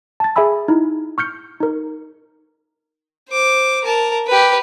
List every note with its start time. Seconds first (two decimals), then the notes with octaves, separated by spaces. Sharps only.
0.20 A5 A6
0.36 G#4 E5 G#5 B5 E6
0.68 D#4 E4
1.18 C#6 F6 G6 C#7
1.60 D#4 A#4
3.29 C5 D6
3.84 A#4 A5
4.27 G4 B4